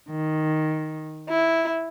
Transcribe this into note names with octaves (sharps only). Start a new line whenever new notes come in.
D#3
E4